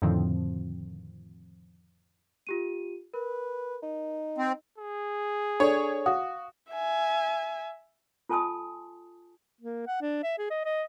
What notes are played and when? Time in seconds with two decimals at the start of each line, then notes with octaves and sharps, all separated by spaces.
0.02 F2 A2 D3 D#3 F3 C4
2.47 F4 G4 D#7
3.14 A#4 B4
3.82 D#4
4.38 C4
4.78 G#4
5.60 D4 A4 C#5 D5
6.06 F#4 F5 D#6
6.72 E5 G#5
8.29 F4 A4 G#5 A5 C6 D#6
9.61 A#3
9.87 F#5
10.01 D4
10.23 E5
10.38 G#4
10.50 D#5
10.65 D#5